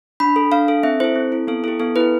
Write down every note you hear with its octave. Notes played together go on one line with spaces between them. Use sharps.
D4 B5
A4
D4 F5
A4
C4 E5
E4 A4 C5
C4
E4 A4
B3 A4
E4 G4 A4
B3 A4
E4 G4 B4